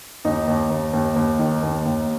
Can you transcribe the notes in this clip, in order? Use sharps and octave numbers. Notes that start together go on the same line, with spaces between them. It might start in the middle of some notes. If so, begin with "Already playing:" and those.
D#2 D#4
D#2
D#2
D#2
D#2
D#3
D#2
D#2